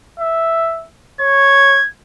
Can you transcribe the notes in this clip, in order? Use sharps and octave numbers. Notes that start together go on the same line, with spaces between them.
E5
C#5 G#6